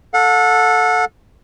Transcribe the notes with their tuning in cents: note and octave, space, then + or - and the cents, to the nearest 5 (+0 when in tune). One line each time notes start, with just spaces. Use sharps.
A4 +0 F#5 -35